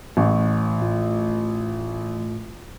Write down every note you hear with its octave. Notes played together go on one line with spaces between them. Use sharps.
A1 F#5 C#6
A2 A3 F4